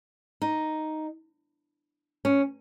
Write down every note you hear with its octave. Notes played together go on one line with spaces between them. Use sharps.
D#4
C#4